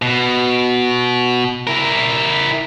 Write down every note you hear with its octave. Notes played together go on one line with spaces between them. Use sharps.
B2
E4 A#4